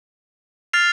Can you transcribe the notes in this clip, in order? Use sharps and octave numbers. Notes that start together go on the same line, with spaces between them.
F6 A6 C7 F7